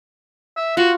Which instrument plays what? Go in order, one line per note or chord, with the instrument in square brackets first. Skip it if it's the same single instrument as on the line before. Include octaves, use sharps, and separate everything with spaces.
[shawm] E5
[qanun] F4 [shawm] F#4